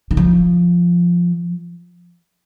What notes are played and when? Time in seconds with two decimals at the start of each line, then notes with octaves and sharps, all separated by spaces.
0.11 D#3
0.17 F3